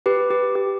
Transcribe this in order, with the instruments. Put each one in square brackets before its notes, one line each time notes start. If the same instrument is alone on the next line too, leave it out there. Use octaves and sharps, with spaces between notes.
[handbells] G4 B4
G4
G4